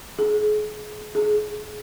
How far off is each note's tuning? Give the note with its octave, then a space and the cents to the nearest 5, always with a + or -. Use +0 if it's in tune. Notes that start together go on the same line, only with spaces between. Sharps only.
G#4 +30
G#4 +20